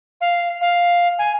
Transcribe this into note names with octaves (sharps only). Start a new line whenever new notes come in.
F5
F5
G#5